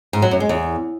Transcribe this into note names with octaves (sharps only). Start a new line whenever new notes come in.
G#2
F#3
F#2
G#3
E2